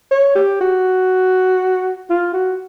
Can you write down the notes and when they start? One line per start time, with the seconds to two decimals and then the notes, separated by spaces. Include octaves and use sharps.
0.11 C#5
0.35 G4
0.61 F#4
2.10 F4
2.33 F#4